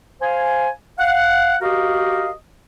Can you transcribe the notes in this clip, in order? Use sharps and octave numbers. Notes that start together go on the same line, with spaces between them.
C5 F5 G#5
F5 F#5
F#4 G4 A#4 D#5 F5